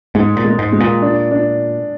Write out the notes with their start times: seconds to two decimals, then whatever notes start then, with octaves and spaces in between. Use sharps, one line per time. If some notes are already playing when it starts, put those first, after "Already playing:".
0.15 G#2 G#3
0.37 A#2
0.44 G#3
0.59 G#2
0.73 G#3
0.80 A#2
1.02 D4
1.31 D4